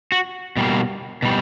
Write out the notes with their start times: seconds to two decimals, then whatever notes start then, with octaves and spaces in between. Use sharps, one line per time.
0.12 F#4
0.57 B2 G3 A#3
1.22 B2 G3